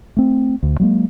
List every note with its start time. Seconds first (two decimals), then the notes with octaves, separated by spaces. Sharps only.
0.17 A3 C4
0.63 D2
0.80 F#3 G#3 A#3